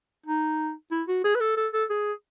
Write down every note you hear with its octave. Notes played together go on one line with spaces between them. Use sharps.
D#4
E4
F#4
G#4
B4
A4
A4
A4
G#4